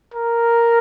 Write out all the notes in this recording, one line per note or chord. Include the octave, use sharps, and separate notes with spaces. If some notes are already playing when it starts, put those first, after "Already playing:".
A#4